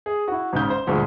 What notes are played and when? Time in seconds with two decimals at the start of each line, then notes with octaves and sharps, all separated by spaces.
0.06 G#4
0.28 E4 F#4
0.53 G#1 G#2 C#3 G6
0.70 C5
0.87 D2 G2 A#2 G#3